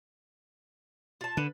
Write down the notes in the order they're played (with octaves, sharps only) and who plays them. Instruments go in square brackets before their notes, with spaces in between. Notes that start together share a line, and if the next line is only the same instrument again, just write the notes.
[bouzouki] F4 A5
[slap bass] D3 [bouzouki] B4